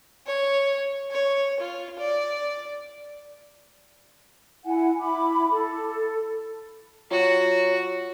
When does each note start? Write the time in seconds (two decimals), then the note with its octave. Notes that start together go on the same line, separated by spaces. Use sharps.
0.26 C#5
1.11 C#5
1.60 F4
1.99 D5
4.65 E4 F#5 G#5
5.01 E4 B5 D6
5.51 A4
7.11 F#3 F4 F#4